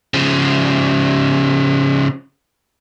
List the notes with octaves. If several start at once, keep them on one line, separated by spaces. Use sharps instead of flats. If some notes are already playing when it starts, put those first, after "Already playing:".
C#3 F3